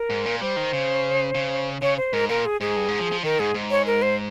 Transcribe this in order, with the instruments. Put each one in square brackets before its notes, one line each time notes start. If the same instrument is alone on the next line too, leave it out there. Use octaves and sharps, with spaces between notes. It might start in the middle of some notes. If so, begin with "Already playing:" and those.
Already playing: [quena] A#4
[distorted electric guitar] G#2
A#2
[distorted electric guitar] G3 [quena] C5
[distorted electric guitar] D#3
C#3
C#3
[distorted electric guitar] C#3 [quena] C#5
[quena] C5
[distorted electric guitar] G#2 [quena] A#4
[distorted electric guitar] A#2 [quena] A#4
[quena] G#4
[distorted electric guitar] G#2 [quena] G#4
[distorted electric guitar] G2
G#2
F3
F3
[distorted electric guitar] D#3 [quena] A#4
[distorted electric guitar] G#2 [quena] G#4
[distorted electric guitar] G#2
[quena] C#5
A#4
C5